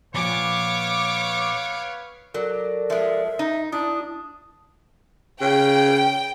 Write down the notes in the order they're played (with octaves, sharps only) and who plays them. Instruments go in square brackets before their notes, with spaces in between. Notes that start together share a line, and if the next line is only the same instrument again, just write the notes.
[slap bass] A#2 F3 [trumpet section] B3 B4 F5 [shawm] C#5 [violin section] D6
[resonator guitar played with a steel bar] F#3 [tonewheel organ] A4 A#4 D5
[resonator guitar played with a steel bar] F3 G#3 [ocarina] E5
[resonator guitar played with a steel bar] D#4
[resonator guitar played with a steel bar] D4 [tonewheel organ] E4 [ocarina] D#6
[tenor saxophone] C#3 [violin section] G5